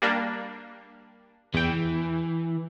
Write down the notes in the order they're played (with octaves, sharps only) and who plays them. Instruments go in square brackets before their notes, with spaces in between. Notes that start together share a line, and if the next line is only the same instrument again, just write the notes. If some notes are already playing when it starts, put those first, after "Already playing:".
[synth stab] G3 A#3 D4
[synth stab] E2 G5 [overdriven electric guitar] E3